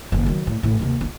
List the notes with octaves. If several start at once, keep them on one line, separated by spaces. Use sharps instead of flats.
F#1 D#2
D#3 F#3
A2
A1 A2
D#2 C3
B3 F4